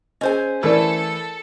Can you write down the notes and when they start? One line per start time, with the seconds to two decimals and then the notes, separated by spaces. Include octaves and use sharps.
0.21 C#4 G#4 C5 D#5 G#5
0.63 E3 A3 E4 A4 A#4 D5